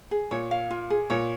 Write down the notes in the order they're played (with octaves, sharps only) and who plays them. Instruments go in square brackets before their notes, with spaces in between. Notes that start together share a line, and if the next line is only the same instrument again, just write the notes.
[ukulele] G#4
[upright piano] A#2 [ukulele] C#5
[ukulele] F5
F4
G#4
[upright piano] A#2 [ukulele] C#5